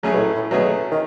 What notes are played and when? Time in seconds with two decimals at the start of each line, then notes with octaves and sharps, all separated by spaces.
0.03 C#3 F#3 A3 C#4 G#4
0.13 B2
0.19 A2
0.35 A2
0.51 B2 F#3 A3 C#4 G#4
0.91 D#3